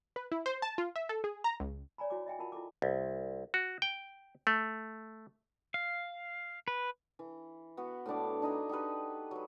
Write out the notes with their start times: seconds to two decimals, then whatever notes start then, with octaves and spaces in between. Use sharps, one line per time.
0.16 B4
0.32 E4
0.46 C5
0.62 A5
0.78 F4
0.96 E5
1.09 A4
1.24 G#4
1.44 A#5
1.60 C#2
1.98 C#5 D5 G#5 A#5 B5
2.10 E4 F#4 C#5 G#5 D6
2.26 D#5 E5 G5 G#5
2.39 F4 A#4 F#5 A5 B5
2.52 E4 F4 A4 B5 D6
2.82 C2
3.54 F#4
3.82 G5
4.47 A3
5.74 F5
6.68 B4
7.19 E3
7.77 B3 F#4 B4
8.06 A2 B3 D4 D6
8.42 D4 D#4 G#5 A#5
8.69 D#4 G4 A4 B4
9.31 F#3 B4